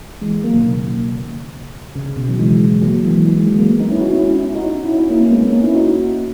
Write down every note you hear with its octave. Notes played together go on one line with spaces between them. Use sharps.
E3 G#3
F#3 A#3
B2 D#3
C#3
C#3
C#3
B2
D#3 F#3
E3 G#3
F#3 A#3
E3 G#3
E3 G#3
D#3 F#3
E3 G#3
F#3 A#3
G#3 B3
B3 D#4
C#4 E4
D#4 F#4
C#4 E4
C#4 E4
C#4 E4
D#4 F#4
C#4 E4
C#4 E4
A#3 C#4
A#3 C#4
G#3 B3
A#3 C#4
B3 D#4
C#4 E4
D#4 F#4